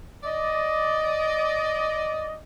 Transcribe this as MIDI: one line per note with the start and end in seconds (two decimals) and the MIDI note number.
0.24 2.35 74
0.24 2.35 75